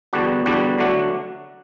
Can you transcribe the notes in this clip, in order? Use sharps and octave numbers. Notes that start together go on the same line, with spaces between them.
E2 D3 G3 D4 F#4
E2 D3 G3 D4 F#4
D3 F#3 A3 D4 F#4